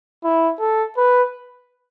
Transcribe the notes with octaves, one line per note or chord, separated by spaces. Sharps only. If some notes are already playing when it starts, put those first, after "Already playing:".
E4
A4
B4